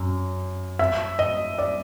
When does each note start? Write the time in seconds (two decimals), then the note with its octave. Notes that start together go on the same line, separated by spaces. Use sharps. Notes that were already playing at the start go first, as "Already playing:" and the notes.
Already playing: F#2
0.79 E5
1.19 D#5
1.58 D5